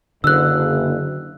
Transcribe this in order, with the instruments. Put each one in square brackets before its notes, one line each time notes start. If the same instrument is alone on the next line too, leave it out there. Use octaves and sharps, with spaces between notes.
[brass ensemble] F#1 [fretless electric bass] D3 [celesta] E6 F#6